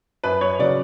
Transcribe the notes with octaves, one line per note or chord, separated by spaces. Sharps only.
F#2 B4
C#5
C#3 F#3 C#4 D5